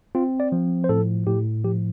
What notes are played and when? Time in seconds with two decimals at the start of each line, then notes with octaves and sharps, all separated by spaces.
0.15 C4 F4
0.40 D5
0.52 F3
0.84 C5
0.89 A2 A4
1.27 A2 G4
1.64 F3 G4